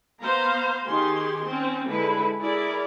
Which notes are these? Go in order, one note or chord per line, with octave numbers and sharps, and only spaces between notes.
B3 C5 F5 A#5
D#3 G4 G#4 C6
C4 C#4
D3 G#3 E4 B4
E4 G#4 A#4 D5